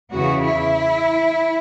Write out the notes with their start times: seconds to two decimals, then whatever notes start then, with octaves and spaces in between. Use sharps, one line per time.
0.12 E2 C#3 E3 F#4
0.44 E4